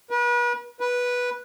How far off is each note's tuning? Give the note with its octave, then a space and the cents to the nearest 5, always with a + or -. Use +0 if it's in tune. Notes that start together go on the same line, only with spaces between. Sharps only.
B4 -40
B4 -10